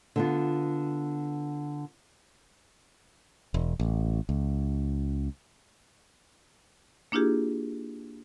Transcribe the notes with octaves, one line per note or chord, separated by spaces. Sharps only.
D3 B3 F4
E1
A1
C#2
A#3 D4 E4 F4 G4 G#4